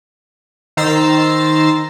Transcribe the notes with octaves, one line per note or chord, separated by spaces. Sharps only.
D#3 C5 A#5 E6 A6 C7